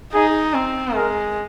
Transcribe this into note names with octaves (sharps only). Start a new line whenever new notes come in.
D#4 G#4
C4
G#3 A#4